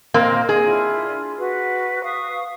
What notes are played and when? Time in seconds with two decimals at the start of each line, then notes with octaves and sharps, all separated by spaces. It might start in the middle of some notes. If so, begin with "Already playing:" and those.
0.14 A#2 A#3 C4 D#5
0.49 G#4
0.65 D4 E4 F4
1.39 F#4 B4
2.04 F5 C#6 D#6